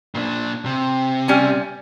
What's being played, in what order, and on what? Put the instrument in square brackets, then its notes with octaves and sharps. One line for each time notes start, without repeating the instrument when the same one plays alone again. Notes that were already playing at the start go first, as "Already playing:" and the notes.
[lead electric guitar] A#2 D4
C3
[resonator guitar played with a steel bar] G3 C#4 G#5